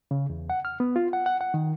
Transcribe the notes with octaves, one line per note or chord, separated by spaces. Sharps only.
C#3
E2
F#5
F6
B3
F4
F#5
F#5
F#5
D#3